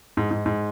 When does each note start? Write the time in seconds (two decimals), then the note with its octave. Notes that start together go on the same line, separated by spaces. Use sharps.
0.17 G#2
0.31 G#2
0.46 G#2